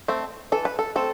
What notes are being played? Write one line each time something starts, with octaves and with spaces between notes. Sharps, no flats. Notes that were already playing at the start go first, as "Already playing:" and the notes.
A3 C4
E3 A4
B4
A4
A3 C4 A4